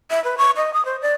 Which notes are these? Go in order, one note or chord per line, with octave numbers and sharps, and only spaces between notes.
E5
B4
C#6
D#5
D#6
C5
D5